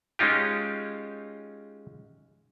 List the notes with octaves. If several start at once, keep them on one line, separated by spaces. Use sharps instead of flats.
G#3 C#4 D#4 F4 G4